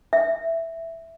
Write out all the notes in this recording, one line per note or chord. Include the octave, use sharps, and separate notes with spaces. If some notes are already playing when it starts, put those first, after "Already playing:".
E5